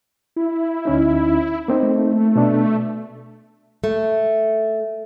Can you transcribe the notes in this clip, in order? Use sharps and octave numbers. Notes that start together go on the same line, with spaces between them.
E4
D2 C#4 D#4
A#3 C4 D#4
A3
B2 D4
A3